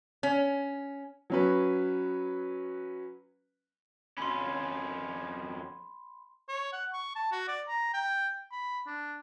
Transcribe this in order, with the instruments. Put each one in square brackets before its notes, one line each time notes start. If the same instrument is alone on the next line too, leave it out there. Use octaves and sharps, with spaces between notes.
[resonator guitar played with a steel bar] C#4
[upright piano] F#3 C#4 B4
[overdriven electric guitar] F2 C#4 [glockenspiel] B5 C6
[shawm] C#5
F#5
C#6
A5
F#4
D5
A#5
G5
B5
D4